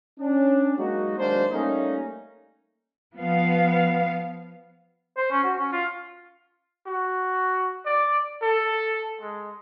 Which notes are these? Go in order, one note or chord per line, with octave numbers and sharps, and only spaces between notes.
C#4 D4
F#3 G#3 A#3 D#4 F#4
D#2 F#3 G#3 A#3 D4 C5
G3 A3 A#3 C#4 D#4
F3 B3 F5
C5
C#4
F#4
C#4
F4
F#4
D5
A4
G#3